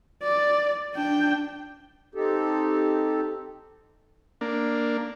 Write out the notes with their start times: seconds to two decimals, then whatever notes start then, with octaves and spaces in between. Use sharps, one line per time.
0.23 D5
0.95 D4 G5
2.15 C4 D#4 G4 A4
4.41 A#3 D4